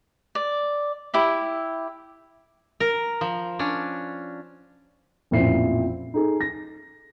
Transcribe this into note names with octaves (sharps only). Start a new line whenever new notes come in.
D5
E4 G4 E5
A#4
F3
C#4 D4
A1 F2 A#2 C4 E4 C7
D#4 G#4 A4
A#6